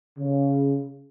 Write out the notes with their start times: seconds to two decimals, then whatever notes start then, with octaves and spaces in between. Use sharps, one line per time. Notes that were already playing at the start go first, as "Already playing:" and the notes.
0.17 C#3